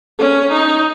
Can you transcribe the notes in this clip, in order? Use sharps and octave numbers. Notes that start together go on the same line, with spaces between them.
C#4
D#4